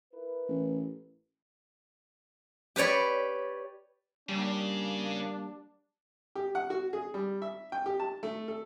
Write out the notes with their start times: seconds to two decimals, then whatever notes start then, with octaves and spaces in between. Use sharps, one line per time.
0.13 E4 A#4 B4
0.48 A1
2.76 G4 B4 C#5 D5
4.29 C#3 G3 A#3 D4
6.35 G4
6.55 F#5
6.70 F#4
6.93 G#4
7.14 G3
7.42 E5
7.72 G5
7.86 G4
8.00 A5
8.23 A3
8.48 A4